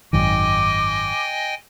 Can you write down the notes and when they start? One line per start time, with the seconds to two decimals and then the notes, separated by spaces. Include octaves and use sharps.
0.13 G#1 F#2 D#3 D#5 G5 G#5 D6